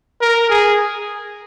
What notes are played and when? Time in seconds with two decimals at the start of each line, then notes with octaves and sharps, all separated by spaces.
0.21 A#4
0.49 G#4